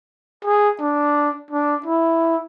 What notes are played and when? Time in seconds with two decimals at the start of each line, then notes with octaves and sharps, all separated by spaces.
0.45 G#4
0.80 D4
1.51 D4
1.86 E4